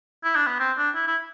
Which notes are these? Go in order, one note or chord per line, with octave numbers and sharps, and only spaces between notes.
E4
D4
B3
C4
D4
E4
E4